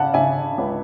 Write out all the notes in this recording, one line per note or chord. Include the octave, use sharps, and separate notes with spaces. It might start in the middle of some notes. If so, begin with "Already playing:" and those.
Already playing: C#3 F#5 A5
C#3 E5 G#5
C#2